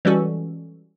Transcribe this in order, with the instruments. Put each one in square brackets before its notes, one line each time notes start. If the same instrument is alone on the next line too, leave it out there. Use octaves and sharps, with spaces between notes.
[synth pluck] E3 G3 G#3 C#4 F#4 A4